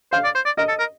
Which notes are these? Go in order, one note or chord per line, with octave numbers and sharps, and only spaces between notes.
C5 F5
D5
C5
D5
A#4 D#5
A4
A#4